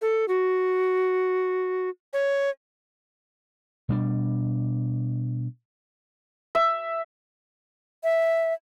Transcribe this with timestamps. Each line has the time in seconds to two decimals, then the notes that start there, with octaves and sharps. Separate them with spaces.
0.02 A4
0.28 F#4
2.13 C#5
3.89 B2 G3 D4
6.55 E5
8.04 E5